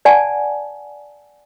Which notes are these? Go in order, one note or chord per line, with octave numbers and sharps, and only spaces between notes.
D5 F#5 G#5 A5